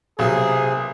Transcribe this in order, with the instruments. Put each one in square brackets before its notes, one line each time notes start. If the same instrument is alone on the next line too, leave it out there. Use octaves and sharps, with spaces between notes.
[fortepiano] B1 [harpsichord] C3 A#3 [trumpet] G#4